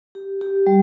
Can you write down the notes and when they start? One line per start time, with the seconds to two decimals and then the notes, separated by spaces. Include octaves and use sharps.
0.15 G4
0.41 G4
0.67 G3